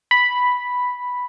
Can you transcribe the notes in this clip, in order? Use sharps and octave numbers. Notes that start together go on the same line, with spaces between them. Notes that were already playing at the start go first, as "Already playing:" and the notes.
B5